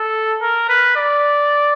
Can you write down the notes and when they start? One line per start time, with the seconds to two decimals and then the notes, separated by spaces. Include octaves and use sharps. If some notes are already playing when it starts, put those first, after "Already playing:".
Already playing: A4
0.41 A#4
0.69 B4
0.97 D5